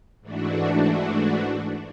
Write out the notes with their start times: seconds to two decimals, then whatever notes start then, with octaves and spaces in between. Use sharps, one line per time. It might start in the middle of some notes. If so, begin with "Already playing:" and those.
0.21 G#2 E3 A3 D4 F#4